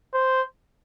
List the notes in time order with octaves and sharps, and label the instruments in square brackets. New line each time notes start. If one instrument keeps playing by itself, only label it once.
[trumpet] C5